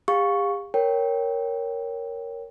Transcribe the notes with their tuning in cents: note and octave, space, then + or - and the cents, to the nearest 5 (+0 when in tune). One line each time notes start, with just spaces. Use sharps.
G4 +45 F5 +20 C#6 +5
A#4 +0 C#5 +0 G5 +0